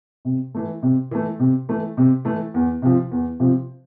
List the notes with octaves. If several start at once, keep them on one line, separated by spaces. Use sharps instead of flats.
C3
E3 A3
C3
E3 A3
C3
E3 A3
C3
E3 A3
E2
C3 F3
E2
C3 F3